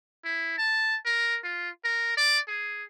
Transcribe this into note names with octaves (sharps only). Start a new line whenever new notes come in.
E4
A5
A#4
F4
A#4
D5
G#4